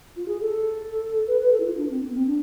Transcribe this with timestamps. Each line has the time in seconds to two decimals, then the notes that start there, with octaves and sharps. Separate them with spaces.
0.16 F4
0.28 G#4
0.41 A4
1.27 B4
1.41 B4
1.52 A4
1.60 E4
1.65 F4
1.77 D4
1.90 C4
2.02 B3
2.15 C4
2.27 D4